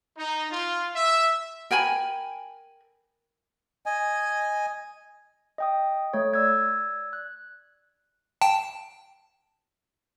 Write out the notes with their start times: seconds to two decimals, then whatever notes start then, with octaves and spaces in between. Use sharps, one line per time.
0.17 D#4
0.50 F4
0.94 E5
1.71 A#4 G5 G#5 B5
3.86 D#5 G#5
5.58 D#5 G5 D#6
6.14 A3 C#5
6.34 D5 E6 G#6
7.13 F#6
8.42 G5 A5